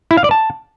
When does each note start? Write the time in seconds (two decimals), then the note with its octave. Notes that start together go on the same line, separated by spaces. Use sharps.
0.11 E4
0.17 F5
0.24 D5
0.31 A5